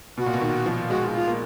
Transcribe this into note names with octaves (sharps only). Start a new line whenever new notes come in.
B2 F#4
A#2
B2
D#3
F3
G#3 F#4
F4
A#3